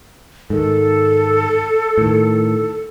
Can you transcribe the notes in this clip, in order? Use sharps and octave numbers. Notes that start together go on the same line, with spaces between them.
G#2 D#3 A4
A2 D#3